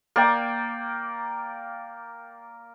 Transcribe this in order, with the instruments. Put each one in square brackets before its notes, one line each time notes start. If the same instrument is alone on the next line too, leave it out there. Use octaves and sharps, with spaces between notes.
[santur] A#3 D5 G5